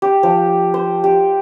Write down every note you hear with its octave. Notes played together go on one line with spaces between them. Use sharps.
G4
F3
C5
G4